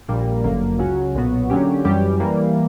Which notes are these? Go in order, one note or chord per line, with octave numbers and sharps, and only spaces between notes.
A#1 A#2 G3 A#3
G1 F#2 D3 A#3
C#2 C#3 F#3 C#4 F#4
B1 A#2 F#3 B3 F#4
D3 F#3 A#3 C#4 G4
F#2 E3 G3 C#4 G4
E3 G3 A#3